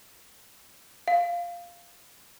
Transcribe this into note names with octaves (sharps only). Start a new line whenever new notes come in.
F5